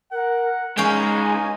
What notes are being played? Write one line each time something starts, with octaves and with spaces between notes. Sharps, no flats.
A#4 F#5
C#2 G#3 C#4 D#4 F5 G5 G#5